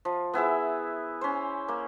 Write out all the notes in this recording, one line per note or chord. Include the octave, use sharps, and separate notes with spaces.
F3
B3 E4 G#4 E5
C#4 C5
A#3